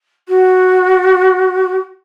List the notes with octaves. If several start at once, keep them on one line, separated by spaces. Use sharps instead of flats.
F#4